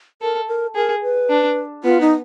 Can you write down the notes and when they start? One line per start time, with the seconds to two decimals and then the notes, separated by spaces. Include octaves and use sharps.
0.22 A4 A#4
0.48 A#4
0.75 G#4 A#4
1.02 B4
1.30 D4
1.84 B3 F4
2.01 D#4